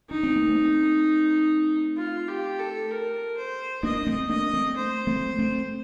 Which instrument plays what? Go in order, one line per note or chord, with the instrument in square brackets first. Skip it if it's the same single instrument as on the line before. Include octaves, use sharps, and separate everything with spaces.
[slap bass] D4 [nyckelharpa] D#4
[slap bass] C4
A#3
A3 C4
[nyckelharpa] F4
G4
A4
A#4
C5
[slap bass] A#3 D4 [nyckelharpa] D#5
[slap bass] A3 C4
[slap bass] A#3 D4 [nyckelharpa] D#5
[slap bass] A3 C4
[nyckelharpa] C5
[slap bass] A3 C4
A3 C4